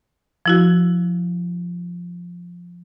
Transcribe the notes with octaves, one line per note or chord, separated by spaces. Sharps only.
F3 E4 F#4